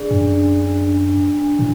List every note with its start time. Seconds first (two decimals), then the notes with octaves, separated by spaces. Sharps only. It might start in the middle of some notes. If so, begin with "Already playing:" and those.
Already playing: D4 G#4 D5
0.11 F#2 D4
0.35 D4
0.60 D4
0.85 D4
1.09 D4
1.34 D4
1.59 A2 D4